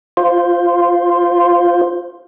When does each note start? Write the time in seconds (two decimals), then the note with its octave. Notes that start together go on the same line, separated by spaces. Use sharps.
0.17 F4 C5